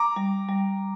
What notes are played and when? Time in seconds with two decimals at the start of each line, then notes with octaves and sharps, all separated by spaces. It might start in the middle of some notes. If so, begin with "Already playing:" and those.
Already playing: A#5 D6
0.16 G3
0.49 G3